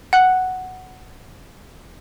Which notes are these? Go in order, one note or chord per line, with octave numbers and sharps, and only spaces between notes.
F#5 F#6